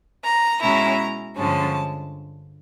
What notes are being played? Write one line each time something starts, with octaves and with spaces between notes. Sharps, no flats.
A#5
B2 G#3 C#4 E4 A#5
G2 D3 F3 G#3 C#4 A5